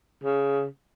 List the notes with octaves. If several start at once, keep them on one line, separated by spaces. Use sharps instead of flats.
C#3